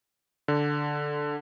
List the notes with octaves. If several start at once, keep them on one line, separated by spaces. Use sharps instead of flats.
D3